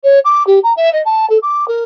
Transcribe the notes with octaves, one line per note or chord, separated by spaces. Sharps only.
C#5
D6
G4
A#5
E5
D#5
A5
A4
D6
A#4